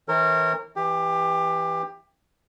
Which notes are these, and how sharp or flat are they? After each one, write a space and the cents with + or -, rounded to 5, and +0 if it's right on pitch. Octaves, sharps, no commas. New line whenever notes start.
E3 -30 A#4 -25 C#5 -40
E3 +0 G4 +20